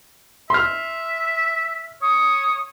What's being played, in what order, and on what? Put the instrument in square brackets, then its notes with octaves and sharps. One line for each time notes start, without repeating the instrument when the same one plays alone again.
[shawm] E5 [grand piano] C6 F6
[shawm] C#5 [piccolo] D#6